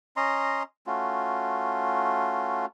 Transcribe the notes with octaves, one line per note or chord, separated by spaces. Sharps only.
C#4 D#5 A#5 C6
A3 C#4 F4 F#4